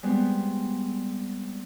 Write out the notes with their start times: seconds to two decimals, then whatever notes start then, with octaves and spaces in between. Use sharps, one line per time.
0.03 G3 G#3 B3 C4